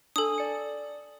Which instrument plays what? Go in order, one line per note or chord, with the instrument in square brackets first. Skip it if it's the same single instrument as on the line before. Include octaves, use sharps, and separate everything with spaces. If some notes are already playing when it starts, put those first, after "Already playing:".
[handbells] D4 G#5 [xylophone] A4 D#6
[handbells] D5 C#7